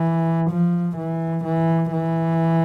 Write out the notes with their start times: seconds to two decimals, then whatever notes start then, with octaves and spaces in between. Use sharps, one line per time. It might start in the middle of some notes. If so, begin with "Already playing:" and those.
Already playing: E3
0.50 F3
0.97 E3
1.45 E3
1.92 E3